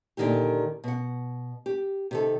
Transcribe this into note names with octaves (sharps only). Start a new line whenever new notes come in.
A#2 D3 D#3 E4 G4
B2 F#5
G4
C3 D#3 A4